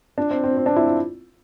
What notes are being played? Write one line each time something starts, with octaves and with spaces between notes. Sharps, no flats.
D4
C4
C4
C4
D4
E4
F4